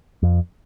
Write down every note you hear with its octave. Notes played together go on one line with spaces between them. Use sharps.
F2